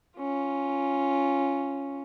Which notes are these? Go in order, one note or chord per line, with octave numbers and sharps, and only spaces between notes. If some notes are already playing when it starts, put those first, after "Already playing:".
C#4 F4